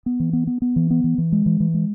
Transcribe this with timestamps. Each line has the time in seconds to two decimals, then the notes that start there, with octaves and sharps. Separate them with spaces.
0.06 B3
0.20 E3
0.33 B3
0.47 B3
0.62 B3
0.76 E3
0.91 B3
1.04 E3
1.18 E3
1.32 G#3
1.46 E3
1.60 E3
1.74 G#3